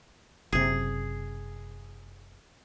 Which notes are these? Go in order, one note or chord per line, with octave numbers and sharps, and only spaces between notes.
F#1 C3 G#4